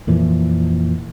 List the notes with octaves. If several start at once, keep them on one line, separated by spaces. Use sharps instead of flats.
F2 A#2 E3 F3